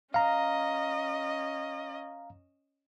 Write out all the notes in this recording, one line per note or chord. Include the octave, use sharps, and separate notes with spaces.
C#4 D#5 F5 A#5